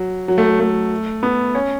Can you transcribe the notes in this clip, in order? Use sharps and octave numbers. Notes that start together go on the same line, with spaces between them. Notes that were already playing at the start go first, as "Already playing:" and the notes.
Already playing: F#3
F#3
A3
F#3
A3
B3
C#4